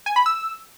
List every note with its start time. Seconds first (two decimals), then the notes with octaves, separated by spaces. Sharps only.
0.06 G#5
0.16 B5
0.26 E6